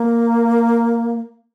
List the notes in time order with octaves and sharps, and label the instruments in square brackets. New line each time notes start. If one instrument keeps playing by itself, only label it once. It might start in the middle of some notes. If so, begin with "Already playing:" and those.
Already playing: [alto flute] A#3